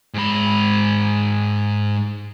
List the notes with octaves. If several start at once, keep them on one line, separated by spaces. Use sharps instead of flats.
G#2 B5